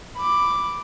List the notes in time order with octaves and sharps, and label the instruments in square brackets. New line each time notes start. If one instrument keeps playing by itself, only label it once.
[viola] B5 D6